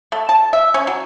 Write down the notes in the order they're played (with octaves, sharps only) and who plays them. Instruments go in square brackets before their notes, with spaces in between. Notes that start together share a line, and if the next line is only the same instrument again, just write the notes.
[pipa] A3
A5
E5
C#4
F#3